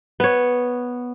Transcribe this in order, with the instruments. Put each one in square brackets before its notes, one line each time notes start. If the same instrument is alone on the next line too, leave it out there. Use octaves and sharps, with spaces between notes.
[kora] B3 C#5